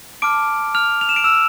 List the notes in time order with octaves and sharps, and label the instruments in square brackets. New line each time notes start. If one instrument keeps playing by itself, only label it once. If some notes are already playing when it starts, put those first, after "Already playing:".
[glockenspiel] A5 D6 F6 D7
F6 F7
F7
E7
D7
E6 E7